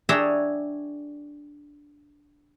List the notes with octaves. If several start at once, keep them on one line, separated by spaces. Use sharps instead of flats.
D4 G#4 C#5 E5 G5 A#5